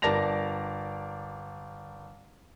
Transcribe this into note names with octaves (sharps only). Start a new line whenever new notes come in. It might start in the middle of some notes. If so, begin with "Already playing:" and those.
G1 A#4 D5 A5 A#6 F7